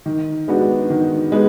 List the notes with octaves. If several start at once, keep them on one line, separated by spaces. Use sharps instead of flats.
D#3
G#3 B3 D4 F#4
D#3
G#3 B3